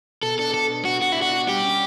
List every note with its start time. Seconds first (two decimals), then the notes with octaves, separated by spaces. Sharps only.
0.23 B2 A4
0.39 D4 A4
0.54 D4 A4
0.70 B2
0.85 B2 F#4
1.01 B2 F#4
1.12 E4
1.18 D4 F#4
1.33 D4
1.48 G3 G4
1.64 C#4